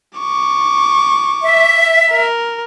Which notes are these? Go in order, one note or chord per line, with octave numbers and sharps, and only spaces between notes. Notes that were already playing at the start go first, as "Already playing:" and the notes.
C#6 D6
E5
A#4